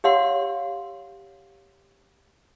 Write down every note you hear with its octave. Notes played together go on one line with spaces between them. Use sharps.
G4 C#5 F5 F#5 C6